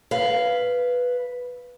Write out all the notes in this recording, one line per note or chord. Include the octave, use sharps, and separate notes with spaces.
B4 F5